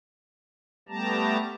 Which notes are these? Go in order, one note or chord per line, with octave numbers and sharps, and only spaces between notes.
G3 A3 B3 G4 A5 A#5